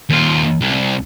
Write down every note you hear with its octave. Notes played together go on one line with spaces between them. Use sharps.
D#2 F4
C2